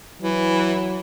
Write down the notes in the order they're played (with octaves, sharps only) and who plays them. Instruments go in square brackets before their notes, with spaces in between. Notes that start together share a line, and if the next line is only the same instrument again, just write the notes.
[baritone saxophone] E3 [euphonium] F#3